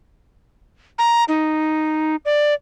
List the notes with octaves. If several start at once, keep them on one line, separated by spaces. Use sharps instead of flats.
A#5
D#4
D5